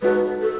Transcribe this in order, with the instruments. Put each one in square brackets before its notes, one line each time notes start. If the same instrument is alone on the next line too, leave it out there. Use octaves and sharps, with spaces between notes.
[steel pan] G#3 D#4 F#4 A4 [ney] B4
[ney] A4